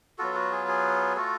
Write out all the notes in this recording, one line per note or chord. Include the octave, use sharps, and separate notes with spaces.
F#3 B3 F4 F#4 A4
F#4
G#4
G#4
A3 F4 F#4 A4